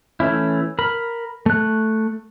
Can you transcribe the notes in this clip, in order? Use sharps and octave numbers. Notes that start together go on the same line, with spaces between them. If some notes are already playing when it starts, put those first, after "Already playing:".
E3 A3 C#4 E4
A#4 B5
A3 F#6